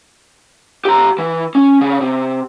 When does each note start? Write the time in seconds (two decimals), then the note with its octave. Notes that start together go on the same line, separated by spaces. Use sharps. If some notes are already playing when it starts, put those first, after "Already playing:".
0.85 G4 A#5
1.19 E3
1.55 C#4
1.81 C#3
2.01 C3